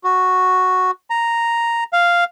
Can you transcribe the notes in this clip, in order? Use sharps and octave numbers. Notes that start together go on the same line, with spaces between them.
F#4
A#5
F5